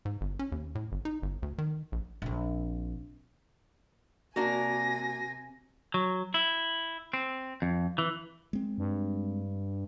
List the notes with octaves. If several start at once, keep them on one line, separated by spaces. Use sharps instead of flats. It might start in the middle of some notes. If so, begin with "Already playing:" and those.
G#2
G1
C#4
D#2
A2
G1
D#4
G1
D2
D#3
A#1
A#1 C4
C3 A#3 D4 F#4 A#4 G#5 A#6
F#3
E4
C4
F2
E3
G#3 C4
G2